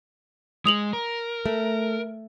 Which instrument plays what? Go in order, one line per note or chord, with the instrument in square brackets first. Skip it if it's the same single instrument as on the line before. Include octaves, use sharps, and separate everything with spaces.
[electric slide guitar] G#3 [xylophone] D#6 F7 F#7
[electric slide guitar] A#4
[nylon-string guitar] A3